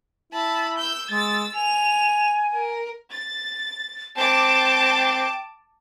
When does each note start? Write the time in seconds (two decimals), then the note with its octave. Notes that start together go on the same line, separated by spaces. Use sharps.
0.32 E4 A5 B5
0.78 E6 G6
1.11 G#3 E6 A6
1.55 G#5 F7
2.53 A#4
3.11 A6
4.18 C4 G5 A5 D6